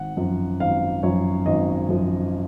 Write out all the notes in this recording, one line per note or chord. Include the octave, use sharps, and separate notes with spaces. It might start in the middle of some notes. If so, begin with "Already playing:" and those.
Already playing: G#1 F#5
F#2 F3
G#1 F5
F#2 F3 C#5
G#1 D#5
F#2 F3